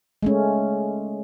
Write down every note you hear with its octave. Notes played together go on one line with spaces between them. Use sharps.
G#3 A3 C#4